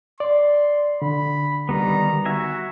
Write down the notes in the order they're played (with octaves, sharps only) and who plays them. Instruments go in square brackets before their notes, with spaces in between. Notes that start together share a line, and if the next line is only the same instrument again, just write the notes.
[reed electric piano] D5 [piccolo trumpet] C6
[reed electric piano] D3 [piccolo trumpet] B5
[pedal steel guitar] D#3 G3 B3 [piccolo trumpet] A#5
[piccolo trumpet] F#4 [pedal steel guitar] E5 G#5 A#5